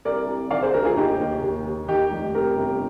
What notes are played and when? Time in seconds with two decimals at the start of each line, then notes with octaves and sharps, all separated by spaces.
0.05 C2 A#4 D5
0.28 C2
0.50 D#3 D5 F5
0.62 G#4 C5
0.74 D2 A#4
0.85 F4 G#4
0.97 D#2 D#4 G4
1.19 D#2
1.42 D#2
1.66 D#2
1.88 D#3 D#4 G4
2.11 F1
2.35 C3 G4 A#4
2.57 G1